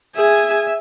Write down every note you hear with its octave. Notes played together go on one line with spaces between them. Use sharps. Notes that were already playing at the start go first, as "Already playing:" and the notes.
G#4 E5 G#5